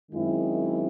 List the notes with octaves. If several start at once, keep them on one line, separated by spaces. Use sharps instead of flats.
F#2 D#3 G#3 C4 E4